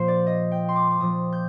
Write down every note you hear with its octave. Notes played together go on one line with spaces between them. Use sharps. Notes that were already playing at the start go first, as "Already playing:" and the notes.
Already playing: A#2 F3 C5
D5
D#5
G5
C6
D6
D6
A#2 F3 D#6
G6